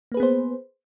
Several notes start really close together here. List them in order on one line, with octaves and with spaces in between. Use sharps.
A#3 B4 G#4 B3 C5